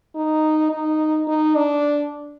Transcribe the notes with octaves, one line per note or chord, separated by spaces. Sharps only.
D#4
D#4
D#4
D4